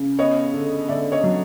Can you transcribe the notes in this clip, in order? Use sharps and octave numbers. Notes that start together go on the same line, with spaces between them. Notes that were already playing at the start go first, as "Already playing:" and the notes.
Already playing: C#3
B3 C#5 D#5
D3
D3 D5 E5
C#5 D#5
F#3